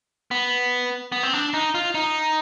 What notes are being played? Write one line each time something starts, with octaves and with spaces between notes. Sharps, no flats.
B3
B3
C4
D4
D#4
F4
D#4